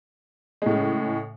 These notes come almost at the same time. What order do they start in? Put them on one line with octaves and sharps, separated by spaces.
G#3 A2 C#3